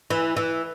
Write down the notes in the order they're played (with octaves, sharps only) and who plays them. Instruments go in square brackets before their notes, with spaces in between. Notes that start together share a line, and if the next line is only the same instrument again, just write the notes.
[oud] E3
E3